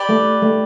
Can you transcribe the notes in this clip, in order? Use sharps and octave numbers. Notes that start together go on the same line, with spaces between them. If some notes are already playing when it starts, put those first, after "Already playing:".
Already playing: G4 B4 D5
A3
A3